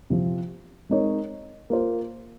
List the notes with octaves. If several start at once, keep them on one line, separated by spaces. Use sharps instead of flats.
C3 F3 C4
G#3 C4 D#4 A#4 C#5
A#3 F4 C5